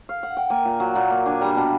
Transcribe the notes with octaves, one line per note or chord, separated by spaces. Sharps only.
F5
F#5
G5
A#3 G#5
A#2
F#3
A#2
A#3
D4 G#5
G3 A#5
B2 A5